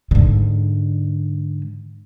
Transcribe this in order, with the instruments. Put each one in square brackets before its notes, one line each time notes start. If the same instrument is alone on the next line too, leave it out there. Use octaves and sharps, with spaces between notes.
[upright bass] G#2 D3